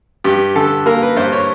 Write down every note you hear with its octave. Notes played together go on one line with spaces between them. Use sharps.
G2 G4
D3 A4
A#3 A#4
B4
G2 C5
C#5